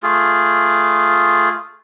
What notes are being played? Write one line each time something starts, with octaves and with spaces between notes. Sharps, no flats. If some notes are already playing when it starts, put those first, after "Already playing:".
A3 F4 G#4